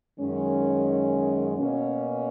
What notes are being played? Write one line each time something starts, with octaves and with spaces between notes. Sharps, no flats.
F#2 D#3 G#3 C#4
B2 A#3 C#4